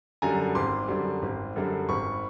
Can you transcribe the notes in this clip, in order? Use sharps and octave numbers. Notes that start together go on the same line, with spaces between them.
F#2 D3 G3 G#5 A#5
G#1 C6 D6
F#2 D3 G3
G#1
F#2 D3 G3
G#1 B5 C#6